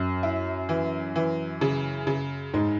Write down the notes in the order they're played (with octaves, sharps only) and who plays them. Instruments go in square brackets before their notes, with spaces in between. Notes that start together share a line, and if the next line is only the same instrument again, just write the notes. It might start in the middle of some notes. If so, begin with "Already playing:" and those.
Already playing: [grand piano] F#2
[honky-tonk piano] E4
E3
E3
C#3
C#3
[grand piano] G#2 [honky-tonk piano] G#3